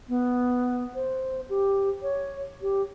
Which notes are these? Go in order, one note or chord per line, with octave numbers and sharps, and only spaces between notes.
B3
C5
G4
C#5
G4